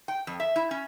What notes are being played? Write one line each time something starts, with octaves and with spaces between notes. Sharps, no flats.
G5
F2
E5
E4
C#4